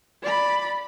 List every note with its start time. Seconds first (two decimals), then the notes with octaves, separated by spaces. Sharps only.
0.23 D5 B5